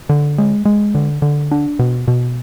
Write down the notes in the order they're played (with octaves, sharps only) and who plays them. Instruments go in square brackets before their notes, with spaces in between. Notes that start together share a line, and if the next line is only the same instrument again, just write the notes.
[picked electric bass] D3
G#3
G#3
D3
D3
D4
B2
B2